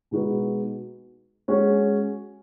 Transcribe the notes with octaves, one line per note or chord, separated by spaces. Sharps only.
B2 G#3 D#4 F#4 B4
G#3 C#4 F#4 C#5